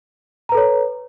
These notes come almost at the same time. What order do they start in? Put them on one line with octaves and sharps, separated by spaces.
A#5 B4 A4 C#5